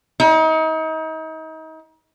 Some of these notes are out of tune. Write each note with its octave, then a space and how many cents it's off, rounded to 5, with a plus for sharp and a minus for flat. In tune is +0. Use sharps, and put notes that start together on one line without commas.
D#4 +35